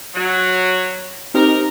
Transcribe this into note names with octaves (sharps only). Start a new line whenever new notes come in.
F#3
C4 D#4 G4 A#4